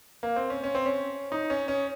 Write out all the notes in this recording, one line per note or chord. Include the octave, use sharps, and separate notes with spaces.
A#3
C4
C#4
C#4
C4
C#4
D#4
C#4
C#4